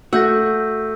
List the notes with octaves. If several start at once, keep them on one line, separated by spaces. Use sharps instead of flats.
A3 F#4 E6 G6 A#6